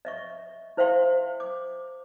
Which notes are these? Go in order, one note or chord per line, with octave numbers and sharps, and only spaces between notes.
D#5 E5 C#6
E4 C5 E5 F5 G5 C6
D6